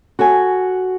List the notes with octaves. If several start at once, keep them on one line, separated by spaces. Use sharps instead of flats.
F#4 A4 F#5 G#5